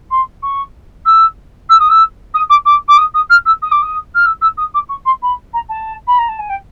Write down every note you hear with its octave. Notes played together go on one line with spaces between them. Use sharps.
C6
C#6
E6
E6
D#6
E6
D#6
D6
D6
D6
D#6
D#6
F6
E6
D#6
D6
D#6
F6
E6
E6
D#6
D6
C#6
C6
B5
A#5
A5
B5
A#5
A5
G#5
G5